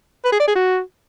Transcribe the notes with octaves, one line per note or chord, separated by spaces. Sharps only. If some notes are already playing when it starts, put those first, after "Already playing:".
B4
G#4
D5
G#4
F#4